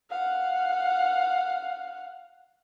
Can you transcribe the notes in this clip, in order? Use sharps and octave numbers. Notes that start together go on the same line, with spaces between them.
F5 F#5